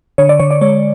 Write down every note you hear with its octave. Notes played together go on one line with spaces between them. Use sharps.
D3 C#5
D5
D3 C#5
D5
G#3 C#5